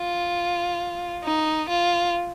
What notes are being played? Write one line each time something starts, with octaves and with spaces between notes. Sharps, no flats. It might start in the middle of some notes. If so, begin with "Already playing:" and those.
Already playing: F4
D#4
F4